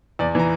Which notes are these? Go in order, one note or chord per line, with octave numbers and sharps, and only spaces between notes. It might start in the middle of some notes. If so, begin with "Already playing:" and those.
E2 D5
E3 A#5